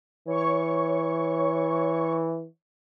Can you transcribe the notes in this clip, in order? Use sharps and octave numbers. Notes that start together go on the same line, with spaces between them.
E3 C#5 C#6